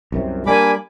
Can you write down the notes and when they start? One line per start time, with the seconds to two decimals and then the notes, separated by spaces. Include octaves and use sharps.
0.12 C2 F#2 C3
0.46 G3 A#3 D4 G#5 B5 D6